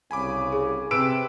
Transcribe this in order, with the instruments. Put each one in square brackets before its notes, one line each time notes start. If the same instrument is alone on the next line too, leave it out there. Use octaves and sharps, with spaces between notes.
[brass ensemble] C2 C#3 [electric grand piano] G#5 B5 D6
[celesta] G#4
[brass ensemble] C3 [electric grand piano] B4 [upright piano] E6 D7